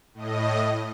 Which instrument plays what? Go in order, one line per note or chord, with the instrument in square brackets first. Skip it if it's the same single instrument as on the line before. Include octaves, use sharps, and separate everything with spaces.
[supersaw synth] A2 D#5